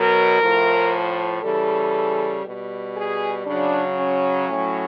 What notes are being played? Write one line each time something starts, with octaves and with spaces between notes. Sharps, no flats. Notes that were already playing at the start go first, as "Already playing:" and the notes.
Already playing: B2 F#3 A#4
A2 F3
C#3 E3 G3 A4
B2 G3
G#4
C#3 F#3 D4
C#4
A2 F#3